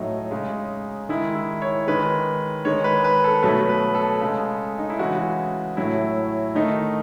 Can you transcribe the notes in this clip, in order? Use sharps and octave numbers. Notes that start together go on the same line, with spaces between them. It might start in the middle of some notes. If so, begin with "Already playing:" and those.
Already playing: A2 F#3 A3 D#4
C#3 G#3
D#3 G#3 E4
E4
C#5
D#3 G#3 B4
D#3 G#3 C#5
B4
B4
A4
B2 F#3 A3 B4
B4
A4
C#3 G#3
D#4
E4
C#3 E3 G#3 F#4
A2 F#3 A3 E4
D#3 A3 D#4